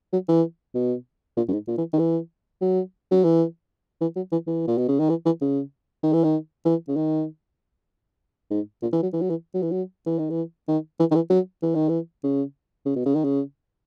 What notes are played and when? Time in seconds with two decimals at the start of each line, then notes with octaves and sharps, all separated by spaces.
0.13 F#3
0.28 E3
0.75 B2
1.37 A#2
1.48 F#2
1.53 G#2
1.67 A#2
1.78 E3
1.93 D#3
1.99 E3
2.61 F#3
3.11 F#3
3.24 E3
4.01 E3
4.16 F#3
4.32 E3
4.47 E3
4.67 A#2
4.78 B2
4.88 C#3
4.99 D#3
5.09 E3
5.25 E3
5.41 C#3
6.03 D#3
6.13 E3
6.24 D#3
6.65 E3
6.88 C#3
6.96 D#3
8.50 G#2
8.82 A#2
8.92 E3
9.02 F#3
9.13 E3
9.21 F#3
9.30 E3
9.54 F#3
9.62 E3
9.71 F#3
10.06 E3
10.18 D#3
10.30 E3
10.68 D#3
10.99 E3
11.11 D#3
11.15 E3
11.30 F#3
11.62 E3
11.75 D#3
11.89 E3
12.23 C#3
12.86 C#3
12.96 B2
13.06 C#3
13.15 D#3
13.24 C#3